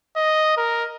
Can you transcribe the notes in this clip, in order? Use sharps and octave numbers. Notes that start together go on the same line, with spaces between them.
D#5
A#4